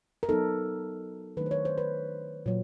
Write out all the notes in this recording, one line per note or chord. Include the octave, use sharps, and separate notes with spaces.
A#4
F#3 B3 D#4 A4
D#3 F#3 A3 D4 B4
C5
C#5
C5
B4
A#2 F#3